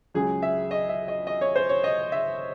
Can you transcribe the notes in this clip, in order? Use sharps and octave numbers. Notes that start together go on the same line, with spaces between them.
C#2 C#3 F#3 G#4
E5
D#5
E5
D#5
D#5
C#5
C5
C#5
D#5
E5